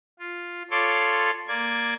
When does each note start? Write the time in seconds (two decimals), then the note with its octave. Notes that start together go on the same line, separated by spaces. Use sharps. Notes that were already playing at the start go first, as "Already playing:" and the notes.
0.19 F4
0.71 F4 A4 C#5 D5 C6 D6
1.48 A#3 D5 G#6